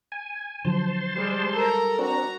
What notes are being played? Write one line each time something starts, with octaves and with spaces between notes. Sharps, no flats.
G#5
D3 F3 F#3 C5 A5 C6
G3 G#3
A4 A#4 A#5
C4 D4 F#4 A#5